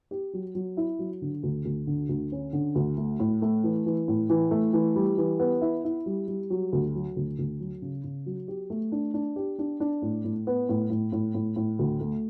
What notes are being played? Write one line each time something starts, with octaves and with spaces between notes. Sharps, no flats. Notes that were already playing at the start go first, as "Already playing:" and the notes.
G4
F#3
F#3
E4
F#3
D3
D2
D2
D3
D2
C#4
D3
D2
A3
A2
A3
E3
E3
A2
E3
A3
E3
G3
E3
B3
E4
E4
G3
G3
F#3
D2
F#3
D2
D2
F#3
C#3
C#3
F#3
G4
A3
D4
D4
G4
D4
D4
A2
A2
B3
A2
A2
A2
A2
A2
D2
A3